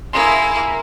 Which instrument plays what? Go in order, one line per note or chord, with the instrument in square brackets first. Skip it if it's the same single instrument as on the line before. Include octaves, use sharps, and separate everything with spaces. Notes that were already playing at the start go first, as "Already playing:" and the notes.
[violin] A#3 E4 [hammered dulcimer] G#4 A#5 C6